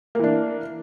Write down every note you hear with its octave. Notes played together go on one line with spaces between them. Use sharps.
E3 A#3 D4